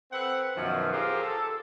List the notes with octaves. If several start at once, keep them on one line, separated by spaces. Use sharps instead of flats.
C4 A4 B4 F#5
F#2 B2 D#3 F3
F4 G4 G#4 A#4 C5
A4